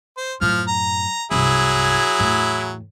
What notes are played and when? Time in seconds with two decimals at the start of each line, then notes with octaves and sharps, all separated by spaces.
0.17 C5
0.41 F#2 A2 F3 F6
0.68 A#5
1.31 C2 G2 F#3 E4 G#4
2.19 E2 A2